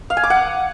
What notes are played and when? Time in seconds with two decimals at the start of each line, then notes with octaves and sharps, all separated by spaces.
0.10 F5
0.17 G#5
0.23 D6
0.30 F#5